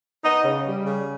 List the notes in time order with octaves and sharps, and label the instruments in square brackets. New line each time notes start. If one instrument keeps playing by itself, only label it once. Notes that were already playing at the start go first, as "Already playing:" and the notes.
[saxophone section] B3 D#4 D#5
C#3
G3
C#3